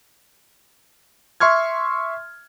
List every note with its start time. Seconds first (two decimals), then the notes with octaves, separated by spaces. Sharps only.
1.40 E5 C6 C#6 F6 G#6